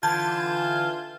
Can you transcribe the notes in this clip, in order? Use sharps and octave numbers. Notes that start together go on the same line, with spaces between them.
D3 E3 F4 A5 G6 G#6